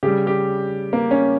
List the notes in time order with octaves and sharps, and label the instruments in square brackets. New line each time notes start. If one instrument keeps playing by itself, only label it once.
[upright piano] C#3 G3 G4
G4
A#3
C#4